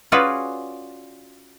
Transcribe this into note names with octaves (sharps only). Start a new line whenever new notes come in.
C#4 F4 F#4 G#4 B4 D5